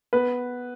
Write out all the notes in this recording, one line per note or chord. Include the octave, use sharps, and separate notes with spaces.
B3 B4